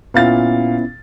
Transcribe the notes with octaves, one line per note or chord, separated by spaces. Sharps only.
A#2 B3 C#4 E4 F5 A6